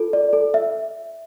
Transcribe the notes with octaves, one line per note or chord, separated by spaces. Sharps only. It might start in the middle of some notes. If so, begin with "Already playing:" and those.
Already playing: F4 A4
D5
A4
E5